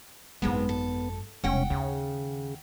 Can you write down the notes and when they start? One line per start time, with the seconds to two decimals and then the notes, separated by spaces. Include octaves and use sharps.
0.42 G#1 F#2 A2 G#3 B3 C4
0.69 A4
1.44 E1 C2 C#4 F#5 G5
1.70 D#2 C#3